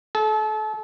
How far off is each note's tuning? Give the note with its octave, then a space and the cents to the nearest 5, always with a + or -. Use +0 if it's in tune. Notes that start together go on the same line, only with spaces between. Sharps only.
A4 -35